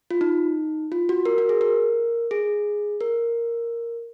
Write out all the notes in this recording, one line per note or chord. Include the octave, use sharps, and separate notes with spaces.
F4
D#4
F4
F#4
A#4
F#4
G#4
A#4
G#4
A#4